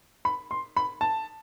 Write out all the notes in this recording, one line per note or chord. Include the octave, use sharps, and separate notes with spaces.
B5
C6
B5
A5